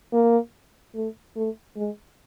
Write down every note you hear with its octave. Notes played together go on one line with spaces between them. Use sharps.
A#3
A3
A3
G#3